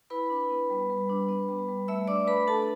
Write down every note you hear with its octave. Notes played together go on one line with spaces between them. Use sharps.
E4 B4 B5
D4
B3
G3
G3
D4
B3
G3
G3
A3 E5 E6
D4 D5 D6
A3 B4 B5
D4 A4 A5